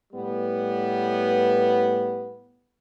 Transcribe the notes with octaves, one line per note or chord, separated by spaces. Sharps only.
A2 G3 B3